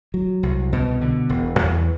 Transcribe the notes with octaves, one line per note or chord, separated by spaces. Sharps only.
F#3
C2
B2
D3
E1
E2